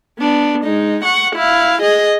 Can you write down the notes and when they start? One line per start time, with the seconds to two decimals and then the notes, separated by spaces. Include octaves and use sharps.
0.19 B3 D4
0.65 G#3 D#4
1.05 F#5 C#6
1.36 E4 F5
1.82 G#4 D#5